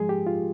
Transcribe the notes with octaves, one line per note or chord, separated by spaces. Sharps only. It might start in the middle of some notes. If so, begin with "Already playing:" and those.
Already playing: G#2 F3 G#3 G#4
G4
F4